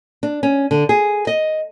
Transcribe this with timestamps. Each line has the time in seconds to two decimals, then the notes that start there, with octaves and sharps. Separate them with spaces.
0.23 D4
0.43 C#4
0.71 D3
0.89 G#4
1.27 D#5